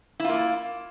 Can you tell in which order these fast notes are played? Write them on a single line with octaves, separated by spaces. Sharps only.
E4 F4 A#3